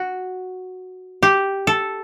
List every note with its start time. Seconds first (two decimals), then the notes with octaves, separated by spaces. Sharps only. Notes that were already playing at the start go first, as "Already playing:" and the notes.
Already playing: F#4
1.23 G4
1.67 A4